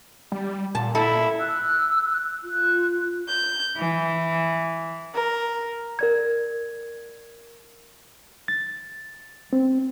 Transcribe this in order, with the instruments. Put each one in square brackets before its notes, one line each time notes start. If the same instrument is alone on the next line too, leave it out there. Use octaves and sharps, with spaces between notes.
[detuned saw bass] G3
[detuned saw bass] A#2 [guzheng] A5
[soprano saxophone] E4 [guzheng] A4
[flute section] E6 F#6
F4 F#6
[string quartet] G6
E3
A#4
[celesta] A#4 D5 G#6
[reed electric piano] A6
C4